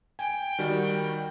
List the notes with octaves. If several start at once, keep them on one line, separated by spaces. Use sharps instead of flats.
G5 G#5
D#3 G3 F#4